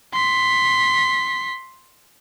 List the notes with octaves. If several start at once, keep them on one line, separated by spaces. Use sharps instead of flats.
C6 B6